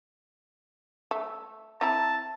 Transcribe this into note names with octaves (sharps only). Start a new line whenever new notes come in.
A3
C4 E4 A5 A#5